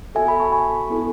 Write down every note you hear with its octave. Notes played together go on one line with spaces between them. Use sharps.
B3 F#4 A4 E5 G#5
G#5 B5
A5 C#6
G#5 B5
B3 E4 A4